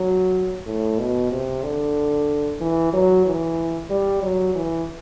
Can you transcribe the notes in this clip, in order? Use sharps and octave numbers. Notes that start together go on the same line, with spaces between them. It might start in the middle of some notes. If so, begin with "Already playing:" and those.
Already playing: F#3
A2
B2
C3
D3
E3
F#3
E3
G3
F#3
E3